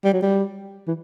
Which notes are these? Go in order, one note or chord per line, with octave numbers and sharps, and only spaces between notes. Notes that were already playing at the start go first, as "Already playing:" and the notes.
G3
F#3
G3
E3